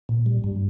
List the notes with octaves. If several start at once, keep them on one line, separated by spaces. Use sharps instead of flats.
A#2
G3
G2